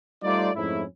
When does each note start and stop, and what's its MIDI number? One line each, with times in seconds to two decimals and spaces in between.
0.23 0.50 55
0.23 0.50 57
0.23 0.50 63
0.23 0.50 65
0.23 0.50 72
0.23 0.50 74
0.55 0.83 41
0.55 0.83 44
0.55 0.83 57
0.55 0.83 61
0.55 0.83 64